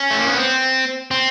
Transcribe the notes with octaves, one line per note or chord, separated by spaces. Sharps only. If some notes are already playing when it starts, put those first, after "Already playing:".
Already playing: C#4
A3
A#3
B3
C4
C4